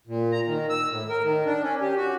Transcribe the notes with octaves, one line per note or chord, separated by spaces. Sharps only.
A#2
A#5
D#3
E6
A2
A#4
D#3
D4
C#4
G4
F#4